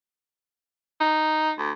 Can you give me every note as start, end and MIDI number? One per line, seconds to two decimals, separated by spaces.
1.00 1.51 63
1.59 1.71 38